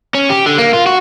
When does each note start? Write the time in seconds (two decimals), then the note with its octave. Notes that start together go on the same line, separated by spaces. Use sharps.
0.15 C#4
0.30 G4
0.46 D3
0.58 A#3
0.73 F4
0.86 F#4